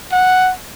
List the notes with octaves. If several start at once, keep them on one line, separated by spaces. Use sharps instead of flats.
F#5